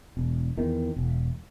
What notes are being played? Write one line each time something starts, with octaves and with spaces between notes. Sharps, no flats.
E1
E2 D#3
E1